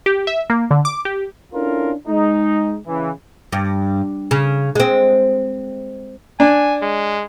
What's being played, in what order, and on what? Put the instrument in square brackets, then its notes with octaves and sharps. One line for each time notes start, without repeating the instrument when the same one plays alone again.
[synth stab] G4
E5
A#3
D3
D6
G4
[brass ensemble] C#4 D4 E4 F4 A4 A#4
G#3 D#4
C#3 E3
[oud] G2
C#3
G#3 C4
[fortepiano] D4 [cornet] G#5
[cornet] G#3